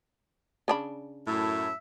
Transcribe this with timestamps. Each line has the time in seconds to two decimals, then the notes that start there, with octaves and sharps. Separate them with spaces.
0.68 C#3 D4 B5
1.27 F#2 A2 E5